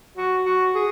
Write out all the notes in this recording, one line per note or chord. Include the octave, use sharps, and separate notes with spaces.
F#4
F#4
G#4